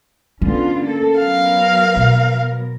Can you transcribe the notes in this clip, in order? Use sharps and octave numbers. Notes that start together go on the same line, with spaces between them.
D3 B3 C#4 F4
A#3 A4
F#3 B3 A#4 F5
B2